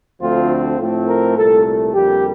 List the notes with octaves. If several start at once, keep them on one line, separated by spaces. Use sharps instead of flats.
D2 D3 F3 A3 C4 F4
A2 F3 A3 C4
A#4
C2 A#2 A3 A4
A4
F2 D3 G3 A#3 G4